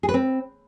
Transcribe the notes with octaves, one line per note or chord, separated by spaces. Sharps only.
G#4
B4
C4